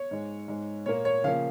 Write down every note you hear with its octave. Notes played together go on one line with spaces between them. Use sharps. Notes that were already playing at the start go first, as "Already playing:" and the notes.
Already playing: C#5
G#2 G#3
G#2 G#3
A#2 A#3 C#5
C#5
C#3 F3 A#3 F5